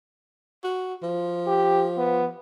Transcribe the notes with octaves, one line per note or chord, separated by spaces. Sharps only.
F#4
F3
G4
B3